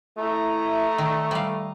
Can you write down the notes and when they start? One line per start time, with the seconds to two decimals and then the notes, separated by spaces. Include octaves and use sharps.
0.18 A3 E4 D#5 A#5
0.98 D#3 D5
1.31 G2 G3 F5